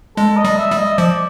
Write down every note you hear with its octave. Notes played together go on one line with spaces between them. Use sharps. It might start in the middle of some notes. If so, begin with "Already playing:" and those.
G#3 A4
D#5
G3
E5
G3
D#5
F3 D5